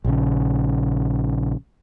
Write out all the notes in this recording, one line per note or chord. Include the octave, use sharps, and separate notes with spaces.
A#1 C#3